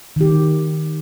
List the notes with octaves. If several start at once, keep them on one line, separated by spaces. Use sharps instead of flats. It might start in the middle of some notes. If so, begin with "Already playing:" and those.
D#3 G4